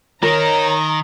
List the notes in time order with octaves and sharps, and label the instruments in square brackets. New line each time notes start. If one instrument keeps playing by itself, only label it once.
[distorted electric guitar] D#3 [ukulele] A#4 [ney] C#5 [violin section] A#5